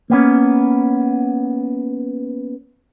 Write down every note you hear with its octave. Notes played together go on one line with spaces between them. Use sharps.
A#3 B3 C#4